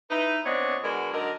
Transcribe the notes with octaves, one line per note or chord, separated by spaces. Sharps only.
D#4 E4 B4
A#2 B3 C4 D4 C#5 D#5
D3 G#3 B3 F#4 A#4 D5
D3 F#3 D#4 A#4